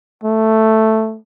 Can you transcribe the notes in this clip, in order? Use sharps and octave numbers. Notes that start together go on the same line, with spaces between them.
A3